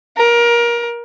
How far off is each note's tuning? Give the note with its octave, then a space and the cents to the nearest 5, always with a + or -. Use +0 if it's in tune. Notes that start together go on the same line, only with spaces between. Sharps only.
A#4 +25